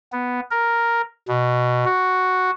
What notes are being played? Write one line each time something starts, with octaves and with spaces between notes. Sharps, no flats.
B3
A#4
B2
F#4